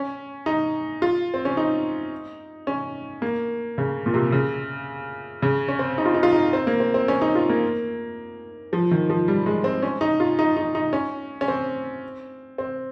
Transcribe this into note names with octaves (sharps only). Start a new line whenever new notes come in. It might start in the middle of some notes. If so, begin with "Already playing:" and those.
Already playing: C#4
D#4
F4
C4
C#4
D#4
C#4
A#3
C#3
A#2
C3
C#3
C#3
C#4
C4
D#4
F4
D#4
F4
D#4
C4
A#3
C4
C4
C#4
D#4
F4
A#3
F3
D#3
F3
G3
G#3
C4
C#4
D#4
F4
D#4
D#4
D#4
C#4
C#4
C4
C4